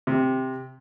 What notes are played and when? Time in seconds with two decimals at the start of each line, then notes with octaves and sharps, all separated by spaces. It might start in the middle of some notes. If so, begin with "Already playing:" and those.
0.07 C3